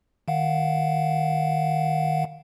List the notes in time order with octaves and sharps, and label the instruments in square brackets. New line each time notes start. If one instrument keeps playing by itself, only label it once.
[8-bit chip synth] D#3 F5 F#5